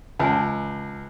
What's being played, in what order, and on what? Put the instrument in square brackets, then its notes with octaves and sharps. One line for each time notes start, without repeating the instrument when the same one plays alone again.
[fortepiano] C#2 [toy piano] G#5 A5